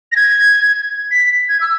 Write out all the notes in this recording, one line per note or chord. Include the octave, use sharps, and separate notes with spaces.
A#6
G#6
B6
G#6
E6